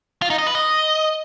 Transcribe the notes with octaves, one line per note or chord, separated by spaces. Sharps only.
F4
D#4
D#5
B4
D#5